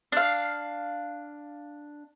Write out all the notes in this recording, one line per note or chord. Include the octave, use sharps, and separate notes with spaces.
D4 F5